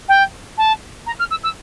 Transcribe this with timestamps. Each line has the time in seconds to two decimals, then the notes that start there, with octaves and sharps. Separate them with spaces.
0.08 G5
0.57 A5
1.06 A#5
1.19 F6
1.30 E6
1.43 E6